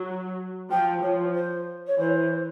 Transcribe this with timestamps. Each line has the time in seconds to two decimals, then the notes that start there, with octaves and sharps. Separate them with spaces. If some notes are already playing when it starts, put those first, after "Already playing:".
Already playing: F#3
0.70 F3 G5
1.02 F3 C#5
1.35 C5
1.87 C#5
1.98 E3 C5